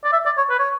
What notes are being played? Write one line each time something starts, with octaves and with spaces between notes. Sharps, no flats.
D5
E5
D5
C#5
B4
C#5